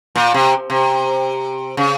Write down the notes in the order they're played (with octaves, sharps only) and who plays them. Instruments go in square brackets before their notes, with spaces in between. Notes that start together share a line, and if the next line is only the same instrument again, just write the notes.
[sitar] A#2
C3
C3
C#3